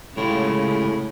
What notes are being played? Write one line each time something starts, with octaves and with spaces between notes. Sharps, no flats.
A2 C#3 G#3 F4 G4